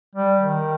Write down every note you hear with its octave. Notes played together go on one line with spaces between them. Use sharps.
G3
D#3